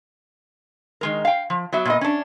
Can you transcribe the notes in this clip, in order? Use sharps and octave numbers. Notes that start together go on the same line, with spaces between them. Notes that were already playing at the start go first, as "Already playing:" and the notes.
D#3 G#3 A#4
F5 G5
F3
F#3 B3 F#4 E5
A#2 B3 D#5
C#4 D4